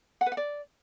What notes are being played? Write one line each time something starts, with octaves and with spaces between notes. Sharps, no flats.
F#5
B4
F#5
D5